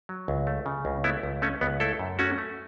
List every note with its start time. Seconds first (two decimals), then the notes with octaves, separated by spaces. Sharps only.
0.09 F#3
0.28 C#2
0.47 A3
0.66 C#3
0.85 C#2
1.04 A3 B3 E4
1.23 C#2
1.42 A3 C#4
1.61 C#2 B3
1.80 A3 E4 A4
1.99 F#2
2.19 A3 C#4 F#4
2.38 A3